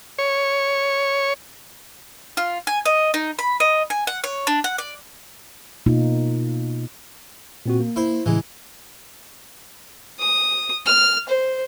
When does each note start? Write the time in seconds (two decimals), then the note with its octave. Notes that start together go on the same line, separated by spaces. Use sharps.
0.19 C#5
2.37 F4
2.67 G#5
2.86 D#5
3.14 D#4
3.39 B5
3.60 D#5
3.90 G#5
4.07 F#5
4.24 C#5
4.47 D4
4.64 F#5
4.78 D5
5.86 B2 A#3 D#4 F4
7.66 A#2 C4 F#4
7.80 A#3
7.96 E4 C5
8.26 A2 C#3 E3 G#3
10.19 D#6
10.86 F6
11.29 C5